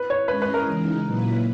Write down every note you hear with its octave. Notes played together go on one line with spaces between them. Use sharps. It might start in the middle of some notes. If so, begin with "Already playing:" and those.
Already playing: B4
C#5
G#3 C#4 G#4 B4 D#5
B4
A#4
C#3 E3 G#3 D#4
A#2 F#3 A#3 E4 B4